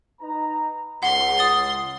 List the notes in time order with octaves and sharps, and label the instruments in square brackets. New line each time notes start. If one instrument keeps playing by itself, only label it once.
[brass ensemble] D#4 B4 A#5
[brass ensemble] C#2 [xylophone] F#5 [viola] C6
[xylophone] D#6 A6 G7